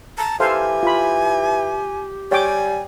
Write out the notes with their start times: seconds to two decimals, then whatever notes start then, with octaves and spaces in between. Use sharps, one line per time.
0.18 A5 A#5
0.40 E3 G4 A4 C5 F5 G#5
0.83 F4 B5
2.31 G3 C#5 G5 G#5 D6